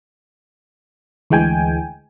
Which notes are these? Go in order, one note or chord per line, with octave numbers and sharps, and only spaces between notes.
D2 E3 G#3 G5 G#5